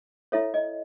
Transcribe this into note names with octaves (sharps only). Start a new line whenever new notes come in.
E4 A4 C#5 E5
D#5